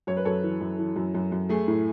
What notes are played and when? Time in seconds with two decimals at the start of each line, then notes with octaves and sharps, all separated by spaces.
0.07 F#2 C#5
0.17 B4
0.25 F#2 A4 C#5
0.43 E3
0.61 F#2
0.78 E3
0.96 F#2
1.15 F#2
1.32 F#2
1.49 A3 G#4
1.68 A2